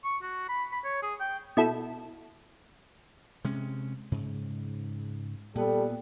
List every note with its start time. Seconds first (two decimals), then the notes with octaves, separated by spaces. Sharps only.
0.04 C#6
0.22 F#4
0.49 B5
0.72 B5
0.84 C#5
1.02 G#4
1.20 G5
1.57 B2 E4 A4
3.44 C3 G#3 C#4
4.12 G#2 C#3
5.55 A#2 G3 B3 A4